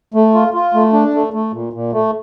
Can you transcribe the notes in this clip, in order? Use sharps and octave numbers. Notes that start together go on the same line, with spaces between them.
A3
F4
F4
A3
D4
A3
A3
A#2
A#2
A3